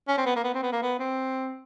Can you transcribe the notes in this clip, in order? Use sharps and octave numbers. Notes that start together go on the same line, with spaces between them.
C#4
C4
B3
A#3
B3
C4
B3
A#3
B3
C4